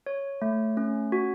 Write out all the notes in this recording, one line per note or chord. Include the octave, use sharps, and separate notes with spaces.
C#5
A3
C#4
F#4